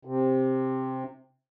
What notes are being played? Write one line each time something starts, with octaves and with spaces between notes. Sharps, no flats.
C3